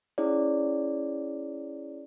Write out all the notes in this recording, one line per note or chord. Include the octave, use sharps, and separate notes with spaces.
C#4 E4 G#4 C#5 D5